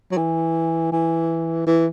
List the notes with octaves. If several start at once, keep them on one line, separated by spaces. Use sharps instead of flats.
F#3
E3
E3
E3